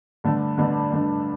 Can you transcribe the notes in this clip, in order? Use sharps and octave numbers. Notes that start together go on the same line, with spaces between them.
G2 D3 A3 D4
G2 D3 A3 D4
G2 D3 A3 D4